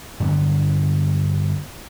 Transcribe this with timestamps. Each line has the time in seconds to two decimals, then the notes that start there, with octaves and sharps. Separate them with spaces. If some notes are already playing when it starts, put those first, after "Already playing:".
0.20 G2 D3 F#3 B3